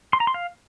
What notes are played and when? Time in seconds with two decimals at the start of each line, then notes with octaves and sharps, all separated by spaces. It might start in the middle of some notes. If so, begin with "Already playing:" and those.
0.13 C6
0.20 A#5
0.27 C6
0.34 F5